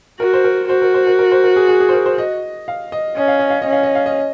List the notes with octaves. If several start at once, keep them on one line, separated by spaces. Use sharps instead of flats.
F#4 A#4
C5
A#4
F#4 C5
A#4
C5
A#4
A#4
C5
A#4
G#4
G#4
G#4
C5
A#4
C5
D#5
F5
D#5
C#4 D#5
F5
D#5
F5
D#5
C#4
F5
D#5
F5
D#5